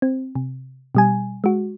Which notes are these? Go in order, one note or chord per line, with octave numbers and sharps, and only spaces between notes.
C4
C3
B2 G3 G#5
G#3 F#4